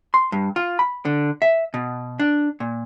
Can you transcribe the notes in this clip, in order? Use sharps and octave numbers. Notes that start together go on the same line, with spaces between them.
C6
G2
F4
B5
D3
E5
B2
D4
A#2